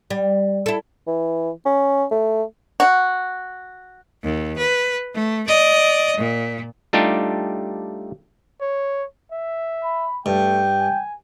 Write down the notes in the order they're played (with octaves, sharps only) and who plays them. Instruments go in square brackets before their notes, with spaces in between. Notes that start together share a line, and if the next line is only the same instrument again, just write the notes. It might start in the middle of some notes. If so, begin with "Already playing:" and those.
[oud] G3
E4 A4
[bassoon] E3
C#4
A3
[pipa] F#4
[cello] D#2
B4
A3
D5 D#5
A#2
[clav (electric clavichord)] G3 A3 D4 D#4 F4 G4
[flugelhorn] C#5
E5
[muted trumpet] B5
[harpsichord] G2 [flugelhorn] A3 [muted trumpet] G5
[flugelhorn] G#5